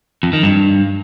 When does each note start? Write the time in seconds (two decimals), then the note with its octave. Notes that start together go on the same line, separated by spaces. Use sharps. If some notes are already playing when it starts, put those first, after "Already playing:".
0.23 F2
0.33 D#3
0.43 G2